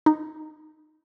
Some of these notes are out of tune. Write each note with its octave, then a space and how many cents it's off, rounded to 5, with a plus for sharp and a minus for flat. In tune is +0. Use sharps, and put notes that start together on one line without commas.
D#4 -5